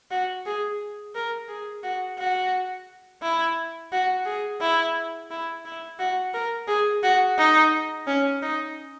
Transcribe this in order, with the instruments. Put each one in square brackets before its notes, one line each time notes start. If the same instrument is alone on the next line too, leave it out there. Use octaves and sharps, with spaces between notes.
[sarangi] F#4
G#4
A#4
G#4
F#4
F#4
E4
F#4
G#4
E4
E4
E4
F#4
A#4
G#4
F#4
D#4
C#4
D#4